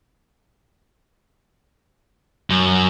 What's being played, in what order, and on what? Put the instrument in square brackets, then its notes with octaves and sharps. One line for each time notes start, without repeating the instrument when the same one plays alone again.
[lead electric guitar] F#2